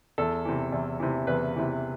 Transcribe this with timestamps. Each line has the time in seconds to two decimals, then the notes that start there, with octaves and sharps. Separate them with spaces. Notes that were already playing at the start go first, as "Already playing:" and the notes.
0.18 E2 A4
0.45 C3 E3
0.72 E2
1.00 C3 E3
1.27 E2 B4
1.56 C3 E3